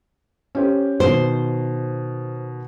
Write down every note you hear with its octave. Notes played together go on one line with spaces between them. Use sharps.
C#4 G4 C5
B2 D#3 C5